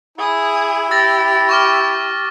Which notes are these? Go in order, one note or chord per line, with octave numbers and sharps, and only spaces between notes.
E4 G#4 D#6
G4 E6 A6 A#6
C#6 D6 F6